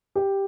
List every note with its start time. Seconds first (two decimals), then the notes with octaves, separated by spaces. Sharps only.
0.15 G4